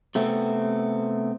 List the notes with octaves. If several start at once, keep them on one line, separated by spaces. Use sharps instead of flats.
C3 A3 B3 C4